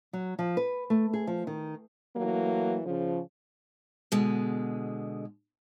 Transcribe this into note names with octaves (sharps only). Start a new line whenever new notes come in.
F#3
F3
B4
A3
G#4
F3
D#3
E3 F#3 A3 A#3
C#3 F3
B2 D3 G#3